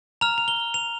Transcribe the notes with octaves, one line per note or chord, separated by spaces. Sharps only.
A#5 F6 F7
F7
G7
F7